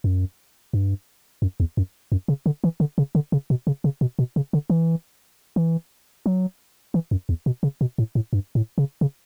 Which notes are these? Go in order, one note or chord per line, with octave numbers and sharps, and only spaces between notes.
F#2
G2
F#2
E2
F#2
F#2
C#3
D3
E3
D3
C#3
D3
C#3
B2
C#3
C#3
B2
B2
C#3
D3
E3
E3
F#3
E3
F#2
E2
B2
C#3
B2
A2
A2
G2
A2
C#3
C#3